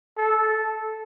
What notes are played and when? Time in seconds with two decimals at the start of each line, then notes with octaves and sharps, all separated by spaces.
0.17 A4